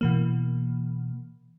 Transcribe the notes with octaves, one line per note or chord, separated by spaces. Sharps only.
B2 E3 A#3